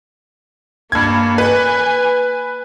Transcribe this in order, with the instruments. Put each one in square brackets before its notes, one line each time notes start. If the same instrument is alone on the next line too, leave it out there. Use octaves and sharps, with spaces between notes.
[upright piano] G2 G#6 [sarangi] A#3
[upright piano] B4 [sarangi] G#5